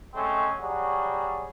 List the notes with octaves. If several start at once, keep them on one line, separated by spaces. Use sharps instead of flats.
G#3 A3 C4 C#4
F#3 G3 F#4 G#4